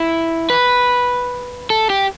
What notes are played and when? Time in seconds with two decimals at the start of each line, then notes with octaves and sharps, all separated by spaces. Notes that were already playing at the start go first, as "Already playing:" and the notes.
Already playing: E4
0.50 B4
1.70 A4
1.90 G4